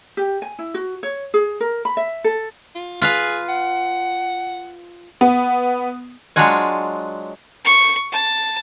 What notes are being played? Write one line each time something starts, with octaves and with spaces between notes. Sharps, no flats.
G4
G#5
E4
F#4
C#5
G#4
A#4
B5
E5
A4
F4
F4 G#4 B4 F5
F#5
B3
F#3 G#3 D4 F4 F#4 G#5
C#6
A5